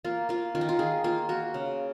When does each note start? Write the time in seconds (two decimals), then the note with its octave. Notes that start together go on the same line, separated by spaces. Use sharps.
0.04 A#3 F4
0.29 A#3 F4
0.55 D#3 F4
0.61 D#4
0.69 F4
0.79 D#3 G#4
1.04 A#3 F4
1.29 A#3 F#4
1.54 C#3